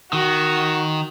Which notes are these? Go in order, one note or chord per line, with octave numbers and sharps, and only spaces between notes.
D#3 F#4